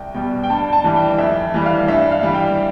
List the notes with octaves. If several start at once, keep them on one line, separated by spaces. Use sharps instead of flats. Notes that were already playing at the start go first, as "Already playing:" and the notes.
Already playing: C2 G5
B2 G3 G5
G5
G2 A5
A5
E3 G3
G5
F2 E5
E3 G3
F5
G2 E5
F5
E3 G3
G5